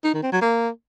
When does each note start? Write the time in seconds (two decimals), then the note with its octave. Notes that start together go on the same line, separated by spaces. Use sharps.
0.04 D#4
0.13 D#3
0.23 C4
0.32 F#3
0.42 A#3